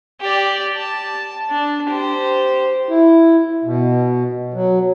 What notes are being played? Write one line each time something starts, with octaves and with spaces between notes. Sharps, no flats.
G4 D5
A5
D4
G4 C5
E4
B2
F#3